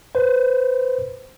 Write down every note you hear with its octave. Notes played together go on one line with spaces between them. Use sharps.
B4 C5